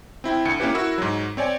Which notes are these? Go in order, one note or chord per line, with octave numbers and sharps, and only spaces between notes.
C4 E4 G5
D2 C#7
A#3 C#4 E4 G4 B4
E4 F#4 A#4 E6
G#2 F#3
C4 C#5 D5 G#5